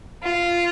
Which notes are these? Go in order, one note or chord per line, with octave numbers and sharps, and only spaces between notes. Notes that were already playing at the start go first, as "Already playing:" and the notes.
F4